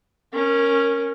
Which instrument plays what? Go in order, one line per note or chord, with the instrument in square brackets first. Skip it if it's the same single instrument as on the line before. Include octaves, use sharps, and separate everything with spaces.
[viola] C#4 A#4